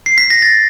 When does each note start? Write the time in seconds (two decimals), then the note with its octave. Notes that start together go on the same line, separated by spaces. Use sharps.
0.06 C7
0.18 B6
0.30 A#6
0.42 A6